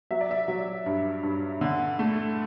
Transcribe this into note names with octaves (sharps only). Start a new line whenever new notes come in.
F#3 E5
D5
E5
F#3
G2
G2
D3
A3